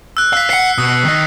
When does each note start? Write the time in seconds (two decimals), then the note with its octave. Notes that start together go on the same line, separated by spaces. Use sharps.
0.17 E6 F#6
0.33 F5 E6 B6
0.50 F5 F#5 C7 C#7
0.78 B2 D#6
1.05 D#3 D#5